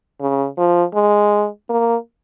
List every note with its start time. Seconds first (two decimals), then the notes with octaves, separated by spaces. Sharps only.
0.20 C#3
0.58 F3
0.95 G#3
1.70 A#3